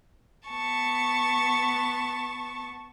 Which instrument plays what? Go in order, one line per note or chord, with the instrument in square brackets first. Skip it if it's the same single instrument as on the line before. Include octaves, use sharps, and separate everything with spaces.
[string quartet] B3 A5 C#6